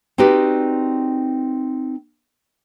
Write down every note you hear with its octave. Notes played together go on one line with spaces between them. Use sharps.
C4 D#4 F#4 G4 B4 D5